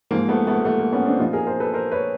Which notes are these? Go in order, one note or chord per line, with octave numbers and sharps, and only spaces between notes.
G#2 F3 A#3
A3 B3
A3 B3
A#3
A3 B3
A#3
B3 C#4
C4 D4
A#2 F3 D#4 F4
G#4 A#4
A#4 C5
A4 B4
A#4 C5
B4 C#5